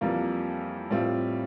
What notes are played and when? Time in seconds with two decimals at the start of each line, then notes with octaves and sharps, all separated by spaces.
0.01 F2 E3 G3 A#3 F4
0.90 A2 G3 C4 F4